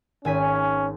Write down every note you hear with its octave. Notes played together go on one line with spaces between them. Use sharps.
G#1 C#4 G#5 B6